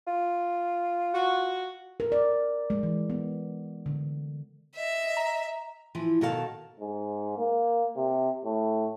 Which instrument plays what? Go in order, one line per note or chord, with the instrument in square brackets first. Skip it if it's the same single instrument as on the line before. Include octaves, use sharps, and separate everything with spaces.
[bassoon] F4
[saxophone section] F#4
[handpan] A#4
D5
G#3
E3
B3
D3
[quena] D#5 [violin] E5
[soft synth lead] A#5
[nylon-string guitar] E3 F3
B2 D#3 F#4 A4 F5 A5
[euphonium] G#2
A#3
C3
A2